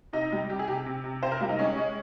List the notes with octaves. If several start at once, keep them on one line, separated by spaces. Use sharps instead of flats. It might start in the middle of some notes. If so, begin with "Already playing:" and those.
C3 D#4
G3
C3 G4
G#4
C3 G4
C3
C3
C3 C5
A#4
G3 F4
D#4
G#3 C#4
G#3